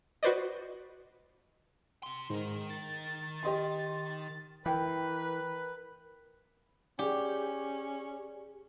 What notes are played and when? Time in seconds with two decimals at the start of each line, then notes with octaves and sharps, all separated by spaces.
0.23 F#4 B4 C5 D5 D#5
2.03 C3 C6
2.30 G#2 D#3 A#4
2.70 A6
3.43 G4 D#5 C6
4.66 E3 A#4 B4 G5
6.99 C#4 G4 G#4 D5